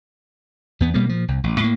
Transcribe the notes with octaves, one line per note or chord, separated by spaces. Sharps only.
E2 B3
B2 G3 A#3 B3
A#2 F3
C2
A1
A2 A#3